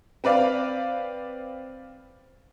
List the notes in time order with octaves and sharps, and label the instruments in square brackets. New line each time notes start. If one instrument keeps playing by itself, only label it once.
[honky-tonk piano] C4 B4 D5 F5